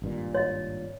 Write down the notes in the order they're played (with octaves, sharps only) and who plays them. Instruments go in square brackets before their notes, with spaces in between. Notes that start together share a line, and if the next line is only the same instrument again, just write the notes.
[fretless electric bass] G#1 G2 A#2
[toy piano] C#5 D#5